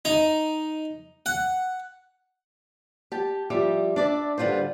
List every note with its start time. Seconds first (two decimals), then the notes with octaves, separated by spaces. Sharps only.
0.05 D#4
1.26 F#5
3.12 G4 A5
3.50 F3 G3 G4 E5
3.96 D4 D5 E5
4.38 D3 G3 F4 B4 C5